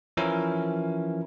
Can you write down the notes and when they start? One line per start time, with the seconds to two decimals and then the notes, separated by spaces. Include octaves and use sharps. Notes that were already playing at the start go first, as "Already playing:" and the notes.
0.17 E3 F3 C#4 E4 A#4